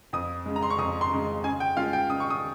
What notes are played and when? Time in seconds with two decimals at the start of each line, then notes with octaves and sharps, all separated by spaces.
0.13 F2 D#6
0.46 C#3 G#3
0.56 A#5
0.63 C6
0.70 C#6
0.78 F2 D#6
1.01 C6
1.11 C#3 G#3
1.44 C#3 G#5
1.60 G5
1.77 G#3 C#4 F4 F5
1.93 G5
2.09 C#3 D#6
2.20 C#6
2.30 D#6